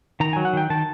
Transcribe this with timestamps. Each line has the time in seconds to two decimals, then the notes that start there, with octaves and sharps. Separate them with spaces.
0.20 D#3 A#5
0.33 F#3 G#5
0.45 F#5
0.53 D#3 G5
0.70 D#3 A5